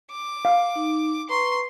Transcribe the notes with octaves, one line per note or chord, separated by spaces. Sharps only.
D6
F5
D#4
B4 A#5 C6 C#6